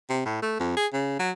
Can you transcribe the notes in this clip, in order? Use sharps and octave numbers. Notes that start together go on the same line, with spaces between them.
C3
A2
A3
F2
G#4
C#3
F#3